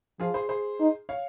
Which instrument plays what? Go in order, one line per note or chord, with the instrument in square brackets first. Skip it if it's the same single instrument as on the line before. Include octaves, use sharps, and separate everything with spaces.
[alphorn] F3 [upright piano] F4 G#4
[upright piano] G#4 C5
G#4 C5
[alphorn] D#4
[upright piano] C#5 F5